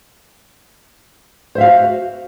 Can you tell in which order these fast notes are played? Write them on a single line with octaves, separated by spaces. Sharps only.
C5 E5 F5 F#4